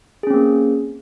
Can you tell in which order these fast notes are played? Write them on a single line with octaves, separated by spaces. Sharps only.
G#4 C#4 C4 A#3